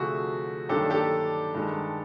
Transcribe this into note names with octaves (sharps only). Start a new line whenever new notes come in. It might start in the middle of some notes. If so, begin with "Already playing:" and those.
Already playing: D2 C3 F3 A3 F#4 G#4
G2 D#3 F#3 A#3 D4 G4 A4
G4 A4
G2 D#3 G#3